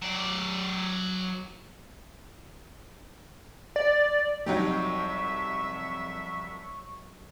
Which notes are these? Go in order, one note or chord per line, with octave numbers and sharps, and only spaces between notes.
F#3 D5
D5
C2 F2 F#3 D#4 G4 E5 C#6